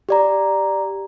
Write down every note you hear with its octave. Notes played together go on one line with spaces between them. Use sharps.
G4 D5 A#5